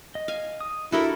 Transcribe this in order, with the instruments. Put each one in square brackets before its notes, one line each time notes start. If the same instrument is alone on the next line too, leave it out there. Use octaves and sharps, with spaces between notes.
[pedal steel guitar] D#5
[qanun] F5 G#5
[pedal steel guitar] D#6
[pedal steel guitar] D4 G4 [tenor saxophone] E4 [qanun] F#4 A4 A#4